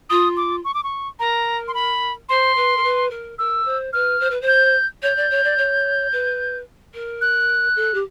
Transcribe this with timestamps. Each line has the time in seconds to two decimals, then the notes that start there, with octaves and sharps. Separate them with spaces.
0.10 F4 D#6
0.37 D6
0.65 C#6
0.74 D6
0.84 C#6
1.19 A#4 A#5
1.68 C6
1.74 B5
2.29 C5 C6
2.56 B4
2.77 A#4
2.83 B4
3.10 A#4
3.39 A#4 E6
3.65 C5
3.93 B4 F6
4.20 C5
4.30 B4
4.41 C5
4.48 G6
5.02 C#5 G6
5.16 D5
5.30 C#5
5.44 D5
5.58 C#5
6.12 B4
6.94 A#4
7.21 F#6
7.76 A4
7.94 G4